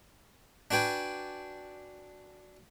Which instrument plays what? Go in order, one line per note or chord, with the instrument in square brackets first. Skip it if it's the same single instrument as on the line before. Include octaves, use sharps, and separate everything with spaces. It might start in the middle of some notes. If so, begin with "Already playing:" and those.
[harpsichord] D4 F#4 B4 G5 G#5